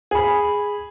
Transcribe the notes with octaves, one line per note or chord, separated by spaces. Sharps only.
G#4 B5